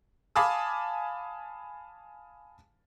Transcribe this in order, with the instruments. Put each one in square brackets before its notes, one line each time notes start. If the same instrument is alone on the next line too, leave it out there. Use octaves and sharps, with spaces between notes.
[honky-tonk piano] F5 G#5 A5 B5 D6 D#6